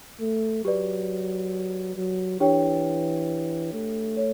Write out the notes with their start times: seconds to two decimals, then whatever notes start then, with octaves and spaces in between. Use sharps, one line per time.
0.20 A3
0.64 F#3 G4 B4 D5
1.96 F#3
2.40 E3 D4 G4 C#5 G5
3.73 A3
4.17 C#5